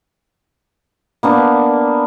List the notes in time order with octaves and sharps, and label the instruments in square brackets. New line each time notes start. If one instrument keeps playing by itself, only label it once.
[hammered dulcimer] A#3 B3 D4